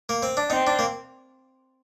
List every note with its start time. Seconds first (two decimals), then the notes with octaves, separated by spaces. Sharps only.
0.09 A#3
0.23 C4
0.37 D4
0.50 C4 D#4
0.67 D4
0.79 A#3